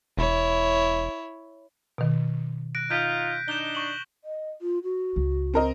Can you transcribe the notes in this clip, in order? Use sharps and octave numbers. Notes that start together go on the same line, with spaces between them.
E1 E4 C#5
B2 D#3
F#6 A#6 D7
D#4 F4 G6 B6
D4 D#4 E7 G7
C#6 F#7
D#5
F4
F#4
C#2
C4 A#4 D#5